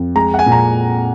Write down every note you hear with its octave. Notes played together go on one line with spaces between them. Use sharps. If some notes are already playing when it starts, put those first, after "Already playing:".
Already playing: F2
G#3 A#5
F#5
G#5
A#2
A#5